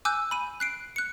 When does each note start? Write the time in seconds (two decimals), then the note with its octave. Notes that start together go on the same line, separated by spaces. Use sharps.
0.05 G#5 D6 E6 F#6 G6
0.31 B5 D#7
0.60 F#6 C7 D7
0.96 F#6 C#7